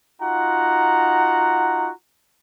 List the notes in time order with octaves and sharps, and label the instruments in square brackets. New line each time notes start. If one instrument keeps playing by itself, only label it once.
[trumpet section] D#4 F4 F#4 F#5 A#5